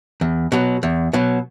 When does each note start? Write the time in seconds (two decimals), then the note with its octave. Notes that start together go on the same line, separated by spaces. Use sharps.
0.21 E2
0.52 B2 F#3
0.83 E2
1.13 B2 F#3